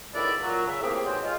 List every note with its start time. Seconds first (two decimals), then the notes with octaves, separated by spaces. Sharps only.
0.14 C#2 A2 D#3 B3 E4 D5
0.41 A#2 F#3
0.66 C#3 E5
0.82 A2 A#3 C4 G4 G#4
1.04 B2 D#3 F#3 G#3 C4
1.23 G#3 F4